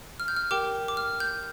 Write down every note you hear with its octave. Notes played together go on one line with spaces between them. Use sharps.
F6
G6
F6
G4 A#4 G5 D6
D6
F6
G6